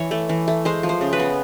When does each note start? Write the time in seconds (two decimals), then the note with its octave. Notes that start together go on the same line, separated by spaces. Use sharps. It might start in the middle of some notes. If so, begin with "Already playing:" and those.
Already playing: E3 C#5
0.11 A3
0.29 E3
0.48 A3
0.65 G#3 C5
0.83 F3
0.89 C5
1.01 C#3
1.13 B4
1.20 B3